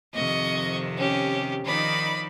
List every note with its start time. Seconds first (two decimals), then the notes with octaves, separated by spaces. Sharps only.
0.13 F2 C3 D#3 D#5 C#6
0.97 C#4 G4
1.65 D#3 F3 D#4 D5 B5